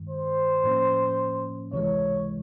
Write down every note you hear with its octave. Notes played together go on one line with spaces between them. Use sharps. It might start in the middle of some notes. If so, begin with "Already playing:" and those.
Already playing: G2 D#3 G#3
C5
A2 F3 A#3 C#4
C#2 C3 E3 G#3 C#5